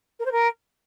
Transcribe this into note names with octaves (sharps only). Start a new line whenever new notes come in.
A#4
C5
A#4